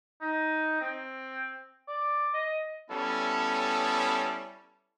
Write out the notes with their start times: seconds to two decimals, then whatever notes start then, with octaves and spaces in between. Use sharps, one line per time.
0.21 D#4
0.81 C4
1.88 D5
2.34 D#5
2.91 G3 B3 C#4 E4 A4